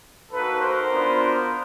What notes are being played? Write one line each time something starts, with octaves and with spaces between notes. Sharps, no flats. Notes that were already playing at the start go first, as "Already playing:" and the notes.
A#3 D#4 F#4 A4 B4
A#4 C5
B3 D4 F4